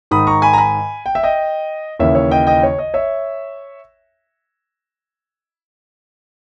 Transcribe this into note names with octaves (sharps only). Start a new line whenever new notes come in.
G#2 D#3 B5 D#6
A#5 C#6
G#5 B5
A#5
G#5 B5
G5
E5
D#5 G5
D#2 C#3 E3 C#5 E5
C#5 E5
D#5 G5
D#5 G5
C#5
D#5
C#5 E5